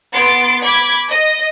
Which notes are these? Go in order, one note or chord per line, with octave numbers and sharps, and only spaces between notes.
B3 C6 A6 D7
B5 D6 G#6
D#5